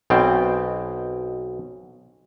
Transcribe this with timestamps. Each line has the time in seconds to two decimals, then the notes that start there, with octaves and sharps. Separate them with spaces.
0.10 B1 B2 C4 G5